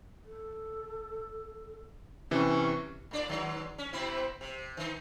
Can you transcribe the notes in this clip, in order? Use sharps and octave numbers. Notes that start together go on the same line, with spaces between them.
A4
C3 E3 C#4
A2 D4 D5
D#3 F#3 G#3
C#4
B2 C4 E4
C3
D#3 D#4